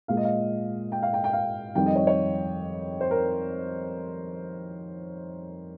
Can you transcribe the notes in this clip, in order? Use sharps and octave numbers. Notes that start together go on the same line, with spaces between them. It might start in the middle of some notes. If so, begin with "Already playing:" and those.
A#2 G#3 F5
D#5
F5
G5
F5
G5
G5
F5
F2 D#3 G3 G5
D#5
C#5
C#5
C5
A#4